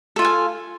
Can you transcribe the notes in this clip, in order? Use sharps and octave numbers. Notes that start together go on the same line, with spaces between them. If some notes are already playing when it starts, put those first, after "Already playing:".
F4 A4 F5 G#5